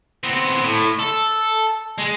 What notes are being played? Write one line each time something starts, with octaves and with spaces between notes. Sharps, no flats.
B3 C4
A2
A4
G#3